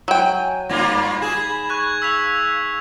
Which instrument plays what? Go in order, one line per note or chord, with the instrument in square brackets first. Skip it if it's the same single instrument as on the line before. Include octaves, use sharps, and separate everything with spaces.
[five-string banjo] F#3 G5 [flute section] G#5
[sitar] G2 A#3 F4 [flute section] B5 [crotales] A#6
[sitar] G#4 [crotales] G#6 E7
[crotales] C#6 F#6 G#6
[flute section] F5 [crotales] E6 B6 F7